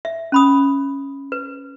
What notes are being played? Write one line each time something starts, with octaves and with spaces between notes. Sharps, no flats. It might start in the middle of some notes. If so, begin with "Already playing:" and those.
E5
C#4 B5 D#6
B4